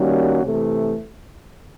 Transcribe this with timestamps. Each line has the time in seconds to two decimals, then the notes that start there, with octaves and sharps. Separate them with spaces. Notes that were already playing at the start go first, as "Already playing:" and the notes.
Already playing: D#3 G3 A#3 C#4 F#4
0.43 C3 E3 A3